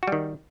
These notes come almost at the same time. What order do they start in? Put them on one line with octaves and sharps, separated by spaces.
F#4 G3 D#3